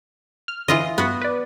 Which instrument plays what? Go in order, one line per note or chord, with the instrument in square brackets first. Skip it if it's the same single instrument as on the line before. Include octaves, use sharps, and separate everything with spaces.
[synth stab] F6
[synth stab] D3 E4 [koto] E3 F4 D#5
[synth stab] G2 [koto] B3 F#4
[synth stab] B4 D5